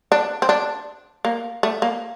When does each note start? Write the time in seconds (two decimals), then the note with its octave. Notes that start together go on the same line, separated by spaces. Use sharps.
0.12 D4
0.42 C4
0.49 D4
1.25 A#3
1.63 A3
1.82 A#3